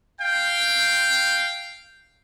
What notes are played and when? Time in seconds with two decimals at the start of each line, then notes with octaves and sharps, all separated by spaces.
0.21 F5 G5